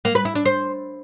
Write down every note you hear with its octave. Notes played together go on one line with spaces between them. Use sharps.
A#3
B4
E4
D4
C5